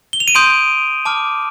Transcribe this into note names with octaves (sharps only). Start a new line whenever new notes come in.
G7
F7
D#7
C6 D#6 G6 D7
A5 D6 F6